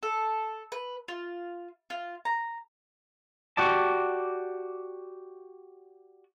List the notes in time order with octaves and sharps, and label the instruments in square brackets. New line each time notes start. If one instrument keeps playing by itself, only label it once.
[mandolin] A4
B4
F4
F4
A#5
[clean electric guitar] F#4 G4 D5 A5